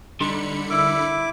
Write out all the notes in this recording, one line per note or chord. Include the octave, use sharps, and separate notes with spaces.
D3 G3 D4 D#4 B5 C6 C#7
E4 A#4 D6 E6